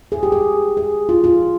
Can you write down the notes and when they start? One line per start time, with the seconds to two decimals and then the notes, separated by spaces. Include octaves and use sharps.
0.12 G#4
0.23 G4
0.32 G#4
0.77 G#4
1.09 F4
1.24 F4